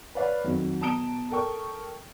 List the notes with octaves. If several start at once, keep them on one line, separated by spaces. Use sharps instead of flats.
B4 C#5 D5 F5 B5
F2 D#3 F#3
B2 A5 A#5 D#6 D7 G7
A4 A#4 G5 C#6